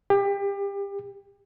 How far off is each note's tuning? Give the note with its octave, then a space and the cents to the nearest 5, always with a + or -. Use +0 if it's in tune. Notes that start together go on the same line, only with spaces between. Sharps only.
G4 +30